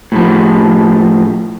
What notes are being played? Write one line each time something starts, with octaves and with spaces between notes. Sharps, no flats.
A2 F3